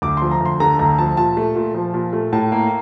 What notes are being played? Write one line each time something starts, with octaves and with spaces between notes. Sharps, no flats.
D2 D6
F3 C6
A#5
D2 C6
D3 A#5
D2 A#5
F3 A5
A#2 A5
A3
A#2
F3
A#2
A3
A2 A5
A#3